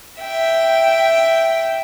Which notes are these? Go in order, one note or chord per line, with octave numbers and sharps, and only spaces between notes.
E5 G5